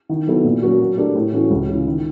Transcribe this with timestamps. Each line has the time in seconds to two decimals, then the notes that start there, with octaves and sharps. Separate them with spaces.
0.09 D#3
0.27 F#3 B3 E4 A4
0.44 A#2
0.62 F#3 A#3 C#4 F#4
0.80 F#3
0.98 A3 D4 G4 A#4
1.15 A2
1.33 E3 A3 C#4 F#4
1.50 C#2
1.69 C#3 E3
1.86 D#3